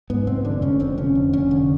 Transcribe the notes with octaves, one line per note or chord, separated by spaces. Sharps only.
G#2 B3
F1 C4
D3 D4
F1 C#4
F1 C4
D3 C#4
D3
F1 C#4
D3